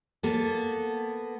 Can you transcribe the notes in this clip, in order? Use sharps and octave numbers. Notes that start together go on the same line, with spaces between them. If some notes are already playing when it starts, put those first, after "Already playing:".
A#3 B3 A4